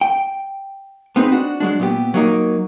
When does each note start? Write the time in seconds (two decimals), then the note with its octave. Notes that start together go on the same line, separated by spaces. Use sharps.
0.01 G5
1.16 B3 C4 D#4 G#4 B4
1.32 D4 F#4
1.60 F#3 G#3 D4
1.79 A#2 B3 G4
2.14 F#3 A#3 D#4